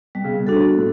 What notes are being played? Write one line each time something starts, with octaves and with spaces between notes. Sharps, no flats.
B2 G3
C#3
B2
D4 F#4 A4
A2